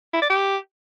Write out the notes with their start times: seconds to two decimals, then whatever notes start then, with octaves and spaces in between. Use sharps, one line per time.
0.14 E4
0.22 D5
0.30 G4